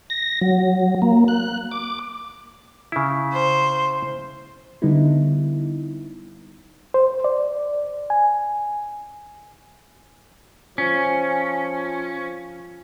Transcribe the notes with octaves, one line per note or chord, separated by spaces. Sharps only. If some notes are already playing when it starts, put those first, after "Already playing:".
A#6
F#3
A#3
F#6
D6
C#3 E4
C5
D3 G3 B3 D#4 E4
C5
D5
G#5
F3 C#4